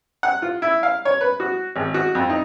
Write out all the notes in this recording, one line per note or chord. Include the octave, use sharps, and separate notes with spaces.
F#5
F4
E4
F5
C#5
B4
F#4
G#1
F#4
F2
D#4